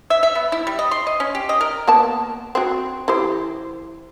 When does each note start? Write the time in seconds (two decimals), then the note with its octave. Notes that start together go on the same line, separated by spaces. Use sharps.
0.10 E5
0.23 E5
0.35 B3
0.52 E4
0.67 G3
0.79 D#5
0.91 C6
1.07 D#5
1.20 C#4
1.35 G4
1.49 D#5
1.61 A#4
1.87 A#3 B3 A5
2.55 C4 F#4
3.08 E3 G4 C5